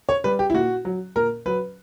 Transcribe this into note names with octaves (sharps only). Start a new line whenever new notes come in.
C#5
G3 B4
G4
E4
A#2 F#4
F#3
A#2 A#4
F#3 B4